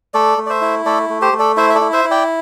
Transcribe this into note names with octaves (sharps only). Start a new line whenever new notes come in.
A3 A4 D5
A3
D5
C5 E5
E4
A3 A4 D5
A3
G4 C5
A3
A4 D5
E4 C5 E5
E5
A4 D5
E4
C5 E5
E4
D5 G5